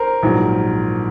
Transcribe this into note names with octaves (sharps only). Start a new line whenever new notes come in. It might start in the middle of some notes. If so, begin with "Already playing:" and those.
Already playing: A#4 C5
A#1 G#2 D#3 F#3